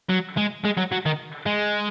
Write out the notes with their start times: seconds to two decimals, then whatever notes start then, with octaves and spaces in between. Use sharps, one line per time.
0.10 F#3
0.37 G#3
0.64 G#3
0.77 F#3
0.92 F#3
1.06 D#3
1.46 G#3